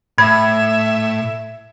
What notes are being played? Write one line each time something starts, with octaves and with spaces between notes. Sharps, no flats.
A2 E5 B5 G#6